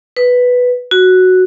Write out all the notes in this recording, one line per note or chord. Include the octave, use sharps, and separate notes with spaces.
B4
F#4